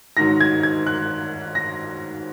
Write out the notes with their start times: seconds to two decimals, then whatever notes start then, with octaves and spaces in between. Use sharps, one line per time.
0.17 G#2 D#3 F#3 A#6
0.41 G#6
0.63 G#6
0.87 F#6
1.55 A#6